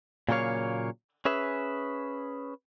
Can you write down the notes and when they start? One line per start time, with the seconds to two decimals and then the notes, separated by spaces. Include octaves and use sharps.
0.29 A#2 C#3 F#3 A#3 C#5 F5
1.25 C#4 G#4 B4 E5